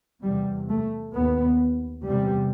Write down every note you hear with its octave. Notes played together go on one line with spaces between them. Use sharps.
E2 C3 G3
A3
D#2 B3
E2 C3 G3